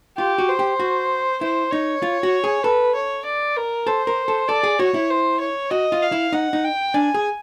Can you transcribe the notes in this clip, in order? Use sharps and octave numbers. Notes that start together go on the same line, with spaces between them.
F4 G4
F#4
C5
G4
F#4
E4 C5
D#4 C#5
F4
F#4
G#4
A4 B4
C#5
D5
A#4
A4 C5
A#4
A4
A4 D5
G#4
F#4 C#5
E4
C5
C#5
F#4 D#5
F4
F5
E4
D#4 F#5
D#4
G5
D4 G#5
G#4